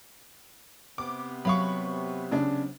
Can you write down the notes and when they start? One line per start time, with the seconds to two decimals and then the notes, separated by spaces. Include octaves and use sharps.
0.98 C3 B3 D6
1.45 F#3 F5 B5 C#6
2.32 C#3 D4